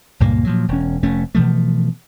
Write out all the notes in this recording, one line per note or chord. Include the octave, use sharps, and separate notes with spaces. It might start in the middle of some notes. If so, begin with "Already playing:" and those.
C#2 G2 A#2 A#3
A#2 F3 F#3
E1 C#4
F1 A3 C#4
B2 E3 F3 A3